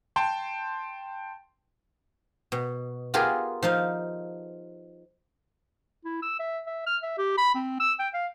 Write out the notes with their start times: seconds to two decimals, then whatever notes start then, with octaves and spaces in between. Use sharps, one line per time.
0.16 G5 A5 C6
2.52 B2
3.14 B3 F4 G4 G#4 A#4
3.63 F3 D#4 F5
6.05 E4
6.22 E6
6.39 E5
6.67 E5
6.87 F6
7.03 E5
7.18 G4
7.38 B5
7.55 C4
7.80 E6
8.00 G5
8.14 F5